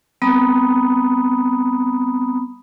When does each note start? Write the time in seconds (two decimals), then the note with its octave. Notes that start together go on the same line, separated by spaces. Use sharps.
0.22 G3 B3 C4 A#5 B5 D#6